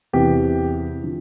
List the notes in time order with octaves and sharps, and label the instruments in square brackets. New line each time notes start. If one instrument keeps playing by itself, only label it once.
[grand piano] E2 C3 E3 G4
D3 F3